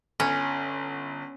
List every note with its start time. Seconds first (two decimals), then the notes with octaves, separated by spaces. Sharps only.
0.20 G1 C#4